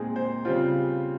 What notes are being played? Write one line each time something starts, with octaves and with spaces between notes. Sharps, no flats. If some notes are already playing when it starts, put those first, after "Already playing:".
Already playing: A#2 G#3 C4 D#4 G#4
C5
C#3 G3 C4 F4 C5